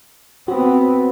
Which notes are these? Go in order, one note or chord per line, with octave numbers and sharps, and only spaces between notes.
B3 C4 F#4